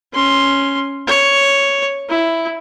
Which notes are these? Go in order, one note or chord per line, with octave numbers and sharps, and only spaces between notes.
C#4 C6
C#5
E4